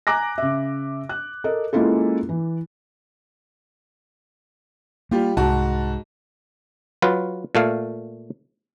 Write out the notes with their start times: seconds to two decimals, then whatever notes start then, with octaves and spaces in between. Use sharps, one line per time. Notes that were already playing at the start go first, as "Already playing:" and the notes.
0.07 G#5 A#5 D6 F#6 A#6
0.38 C#3 E5
1.09 F#6
1.44 A4 A#4 D#5
1.73 G#3 A#3 C#4 E4 F4 A4
2.29 E3
5.11 G3 A#3 F4 G4
5.37 C2 G#2 F#4 A5
7.02 F#3 F4 B4
7.55 A#2 A3 F5